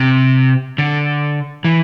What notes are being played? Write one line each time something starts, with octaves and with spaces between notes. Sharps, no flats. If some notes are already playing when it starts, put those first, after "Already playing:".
Already playing: C3
D3
E3